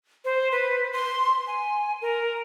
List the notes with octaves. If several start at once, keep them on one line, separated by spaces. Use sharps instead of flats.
C5
B4
C6
G#5
A#4